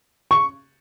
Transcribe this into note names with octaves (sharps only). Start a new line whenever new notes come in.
C#6